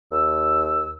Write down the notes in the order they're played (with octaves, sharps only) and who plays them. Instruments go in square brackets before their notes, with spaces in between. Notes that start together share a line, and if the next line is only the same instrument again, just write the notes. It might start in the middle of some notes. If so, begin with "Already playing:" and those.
[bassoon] D#2 [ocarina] E6